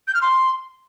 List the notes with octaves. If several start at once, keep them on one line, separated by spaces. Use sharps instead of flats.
G6
F6
C6